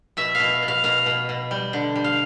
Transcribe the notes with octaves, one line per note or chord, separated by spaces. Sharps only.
B2 E5
B2 F5
B2
F5
B2 F5
B2
B2
G3
D3
G3
F5